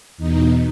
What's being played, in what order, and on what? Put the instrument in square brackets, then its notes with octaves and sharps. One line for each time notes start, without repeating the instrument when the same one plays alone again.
[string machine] E2 B2 D#4